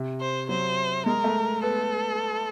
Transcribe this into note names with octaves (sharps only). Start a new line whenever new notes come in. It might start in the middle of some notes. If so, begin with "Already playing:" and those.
Already playing: C3
C5
F#3 C5
G#3 A#4
A3
B3 A4